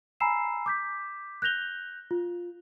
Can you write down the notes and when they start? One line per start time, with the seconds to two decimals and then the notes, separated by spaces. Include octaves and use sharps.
0.20 G#5 A#5 B5 E6 C7 E7
0.66 D6 G6 B6
1.42 F#6 G6 A#6 F7 G7
2.11 F4